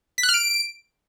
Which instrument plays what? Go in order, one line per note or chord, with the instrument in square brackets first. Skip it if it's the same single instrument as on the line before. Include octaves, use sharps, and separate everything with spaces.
[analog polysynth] B6
F#6
F6
D7